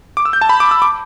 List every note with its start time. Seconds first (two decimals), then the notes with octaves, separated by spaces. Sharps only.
0.17 D6
0.25 E6
0.33 G6
0.41 A5
0.49 B5
0.60 D6
0.71 E6
0.82 D6